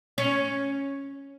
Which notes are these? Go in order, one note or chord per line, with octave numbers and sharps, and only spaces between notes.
C#4